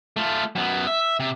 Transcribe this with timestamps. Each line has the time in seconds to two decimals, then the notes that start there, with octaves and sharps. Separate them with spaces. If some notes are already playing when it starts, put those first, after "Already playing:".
0.17 A3 F4
0.55 F#2 B3
0.87 E5
1.20 C3